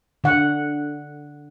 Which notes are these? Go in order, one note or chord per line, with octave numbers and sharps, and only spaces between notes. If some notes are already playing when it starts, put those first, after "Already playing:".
D3 F#5